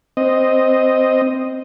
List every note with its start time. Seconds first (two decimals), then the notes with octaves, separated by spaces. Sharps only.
0.17 C4 D#5